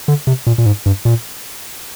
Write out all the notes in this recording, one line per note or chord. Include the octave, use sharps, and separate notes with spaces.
D3
C3
A#2
A#2
G#2
G2
A#2